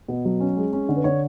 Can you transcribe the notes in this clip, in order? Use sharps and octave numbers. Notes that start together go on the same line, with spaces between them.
B2
F#3
C#4
G#3
C#4
D3
B4
D3 C#5